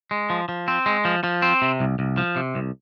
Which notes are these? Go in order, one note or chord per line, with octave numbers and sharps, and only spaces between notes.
G#3
F3
F3
C4
G#3
F3
F3
C4
C3
C2
C2
F3
C3
C2